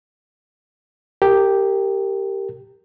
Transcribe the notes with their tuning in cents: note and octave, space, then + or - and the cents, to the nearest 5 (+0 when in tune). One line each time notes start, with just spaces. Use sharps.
G4 +0 A#4 -25